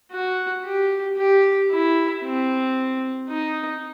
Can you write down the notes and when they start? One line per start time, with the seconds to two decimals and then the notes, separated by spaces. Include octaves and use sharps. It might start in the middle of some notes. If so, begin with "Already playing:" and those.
0.11 F#4
0.64 G4
1.17 G4
1.71 E4
2.24 C4
3.29 D#4